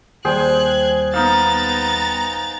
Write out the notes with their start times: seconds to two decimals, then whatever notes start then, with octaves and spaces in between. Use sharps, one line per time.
0.25 D#2 G3 G#4 C5 G5 F#6 G#6
1.14 B3 D#4 F5 A#5 A6